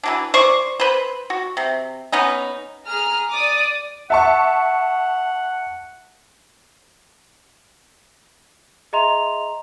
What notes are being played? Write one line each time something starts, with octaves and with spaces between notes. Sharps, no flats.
E3 F#3 D4
C5 D5 C#6
B4 C5
F#4
C3
B3 C#4 D#4
G#4 A#5 F6
D5 D6 D#6
E5 F#5 A5 C#6
G#4 D#5 E5 A#5 C6 F7